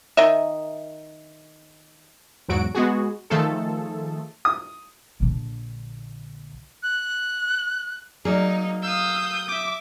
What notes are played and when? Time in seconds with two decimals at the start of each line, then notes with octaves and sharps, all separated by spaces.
0.17 D#3 A#4 D#5 E5
2.48 E2 G#2 F#3 F#4 D7
2.75 G#3 B3 F#4 G#4
3.30 D#3 F3 A3 F4 G#4 A4
4.45 D#6
5.20 A#1 D3
6.83 F#6
8.25 F#3 A3 A#3 D#4 G#4 D5
8.82 F5 D#6 E6 G6
9.48 E5 D6